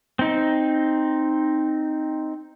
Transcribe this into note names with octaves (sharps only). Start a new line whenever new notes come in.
C4 D#4